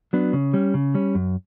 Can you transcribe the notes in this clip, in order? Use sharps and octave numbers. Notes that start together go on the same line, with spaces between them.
F#3 B3 D4
C#3
G3 C#4
C#3
G3 C#4
F#2